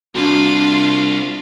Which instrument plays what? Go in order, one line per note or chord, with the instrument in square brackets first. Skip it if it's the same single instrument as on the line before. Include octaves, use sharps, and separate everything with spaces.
[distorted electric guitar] C2 [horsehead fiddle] D4 [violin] F4 F5 [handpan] F#4